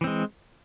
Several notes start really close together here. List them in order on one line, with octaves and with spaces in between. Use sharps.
E3 C4 G#3